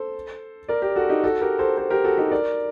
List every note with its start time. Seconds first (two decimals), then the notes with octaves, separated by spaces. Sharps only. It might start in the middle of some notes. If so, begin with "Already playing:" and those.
Already playing: A4 C5
0.69 A#4 D5
0.82 G4 A#4
0.96 F#4 A4
1.09 D#4 G4
1.24 F#4 A4
1.41 G4 A#4
1.59 A4 C5
1.77 A4 C5
1.90 G4 A#4
2.04 F#4 A4
2.18 D#4 G4
2.32 A#4 D5